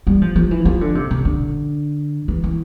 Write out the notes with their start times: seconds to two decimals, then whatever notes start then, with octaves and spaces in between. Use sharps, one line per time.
0.07 G3
0.22 F3
0.36 F3
0.51 E3
0.65 F3
0.81 D3
0.95 C3
1.11 C3
1.25 D3
2.28 E3
2.44 E3